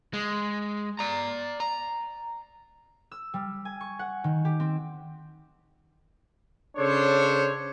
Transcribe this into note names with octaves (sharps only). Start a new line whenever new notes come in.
G#3
D5 A#5
A#5
E6
G3
G#5
C#6
F#5
D#3
G4
C4
C#3 D4 A4 C5 C#5